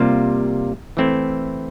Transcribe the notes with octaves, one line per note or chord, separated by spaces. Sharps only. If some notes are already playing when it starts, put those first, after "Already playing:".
Already playing: C3 G3 A#3 F4 C5
E3 A3 C4 E4